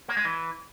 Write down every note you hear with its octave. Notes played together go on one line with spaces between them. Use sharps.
A#3
G#3
E3